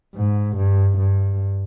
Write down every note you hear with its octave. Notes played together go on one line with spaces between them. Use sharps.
G#2
G2
G2